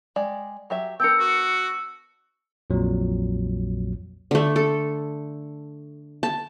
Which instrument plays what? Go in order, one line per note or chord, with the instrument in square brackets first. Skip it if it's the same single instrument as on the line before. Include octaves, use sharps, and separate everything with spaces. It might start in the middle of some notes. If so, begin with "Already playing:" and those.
[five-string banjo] G#3 D5 G5
F#3 G4 E5
[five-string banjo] B3 D4 A#4 [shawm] G5 [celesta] E6 C#7
[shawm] F#4
[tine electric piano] A#1 F2 A#2 F#3
[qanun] D3 A3
A4
A5